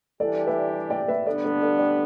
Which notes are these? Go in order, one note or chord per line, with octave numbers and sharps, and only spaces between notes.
E3 G3 D4 G4 A4 D5
B4 E5
D5 G5
B4 E5
G2 D3 B3 D4 A4 D5
A4 D5
A4 D5
D5 G5